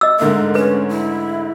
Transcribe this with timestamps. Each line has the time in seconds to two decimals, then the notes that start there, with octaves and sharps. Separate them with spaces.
0.01 D#5 E6
0.20 G#2 D3 A3 A#4
0.55 C#4 B4
0.89 E4